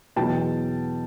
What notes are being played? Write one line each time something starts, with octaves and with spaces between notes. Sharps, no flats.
E2 B2 F#3 G5 A5